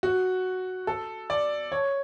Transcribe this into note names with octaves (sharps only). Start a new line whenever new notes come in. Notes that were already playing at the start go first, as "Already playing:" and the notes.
F#4
A4
D5
C#5